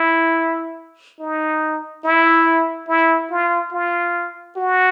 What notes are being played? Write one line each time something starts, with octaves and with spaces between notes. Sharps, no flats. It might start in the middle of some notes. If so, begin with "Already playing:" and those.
Already playing: E4
D#4
E4
E4
F4
F4
F#4